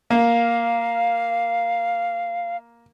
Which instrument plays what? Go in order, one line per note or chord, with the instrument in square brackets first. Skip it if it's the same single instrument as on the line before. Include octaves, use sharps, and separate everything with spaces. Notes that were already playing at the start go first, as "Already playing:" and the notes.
[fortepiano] A#3 [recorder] F5